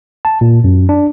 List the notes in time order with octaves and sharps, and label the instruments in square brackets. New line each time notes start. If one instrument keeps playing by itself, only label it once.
[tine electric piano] A5
A#2
F#2
D4